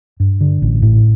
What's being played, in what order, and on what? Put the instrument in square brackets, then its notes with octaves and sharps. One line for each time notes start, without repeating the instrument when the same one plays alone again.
[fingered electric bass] G2
D3
A1
A2